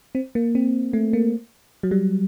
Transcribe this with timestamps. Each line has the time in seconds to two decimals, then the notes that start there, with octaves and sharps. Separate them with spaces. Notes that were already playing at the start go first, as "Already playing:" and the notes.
0.15 C4
0.35 A#3
0.55 C4
0.93 A3
1.13 A#3
1.83 F#3
1.91 G3